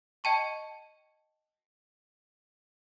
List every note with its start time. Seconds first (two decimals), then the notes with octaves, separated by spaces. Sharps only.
0.24 D#5 G5 A5 C#6